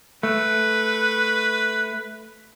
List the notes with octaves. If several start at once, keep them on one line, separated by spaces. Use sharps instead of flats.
A3 B4